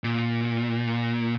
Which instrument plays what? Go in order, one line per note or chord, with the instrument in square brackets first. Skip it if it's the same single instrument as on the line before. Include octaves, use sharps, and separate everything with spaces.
[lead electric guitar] A#2